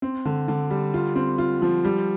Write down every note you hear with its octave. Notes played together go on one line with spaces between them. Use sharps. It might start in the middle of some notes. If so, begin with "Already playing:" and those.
C4
D3
D3
G3
F4
C4
F4
F3
G3